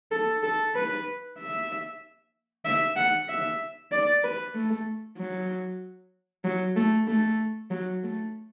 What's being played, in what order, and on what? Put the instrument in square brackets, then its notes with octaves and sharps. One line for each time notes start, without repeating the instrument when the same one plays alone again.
[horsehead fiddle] A4
A4
B4
E5
E5
F#5
E5
D5
B4
A3
F#3
F#3
A3
A3
F#3
A3